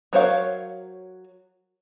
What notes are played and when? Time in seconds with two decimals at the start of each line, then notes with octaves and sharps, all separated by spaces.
0.13 F#3 A#4 C5 C#5 F5